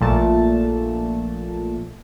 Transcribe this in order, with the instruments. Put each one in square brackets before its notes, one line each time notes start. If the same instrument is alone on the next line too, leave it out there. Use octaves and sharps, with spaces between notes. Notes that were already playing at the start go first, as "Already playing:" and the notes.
[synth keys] A#1 A#2 A3 A5